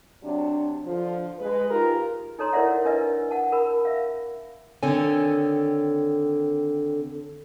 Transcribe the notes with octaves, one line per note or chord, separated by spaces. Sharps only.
C3 F#3 D4
D3 F3
G#3 B4
D#4 F4 G4 G#4 A#4
D#4 A4 C#5 A#5 C6
E4 A#4 C#5 D5 E5 F#5
D4 A#4 B4 D#5 E5
F#5 A5
A#4 B5
E5 F5
D3 D#3 C4 A4 C#5 G#5